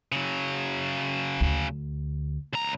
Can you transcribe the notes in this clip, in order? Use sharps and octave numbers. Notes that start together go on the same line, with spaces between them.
C#3 F#3
D2
C#2 A#5